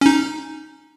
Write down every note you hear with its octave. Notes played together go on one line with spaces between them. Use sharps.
C#4 D#4